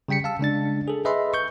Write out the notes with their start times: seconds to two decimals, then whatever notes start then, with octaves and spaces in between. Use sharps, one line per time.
0.08 C#3 G3 G5 B6 C#7
0.24 F5 A5 E6
0.39 C#3 G#3 D4 A6
0.88 G#4 A4
1.05 G#4 B4 D#5 E5 B5 C6
1.34 C#6 G6